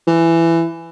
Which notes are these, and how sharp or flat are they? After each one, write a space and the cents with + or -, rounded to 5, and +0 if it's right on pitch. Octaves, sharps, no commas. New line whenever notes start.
E3 +15